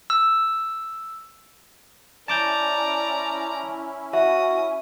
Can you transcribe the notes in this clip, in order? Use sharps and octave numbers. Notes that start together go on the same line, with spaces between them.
E6
C#4 E4 D5 A5 A#5 D6 G6
F#4 E5 D#6